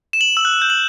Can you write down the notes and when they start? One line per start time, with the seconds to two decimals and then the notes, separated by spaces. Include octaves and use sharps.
0.13 E7
0.21 F#7
0.37 E6
0.45 F#6
0.62 G6
0.70 F#7